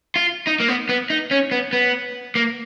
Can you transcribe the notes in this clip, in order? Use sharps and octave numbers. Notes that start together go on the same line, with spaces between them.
F4
D#4
A#3
B3
B3
D#4
C#4
B3
B3
A#3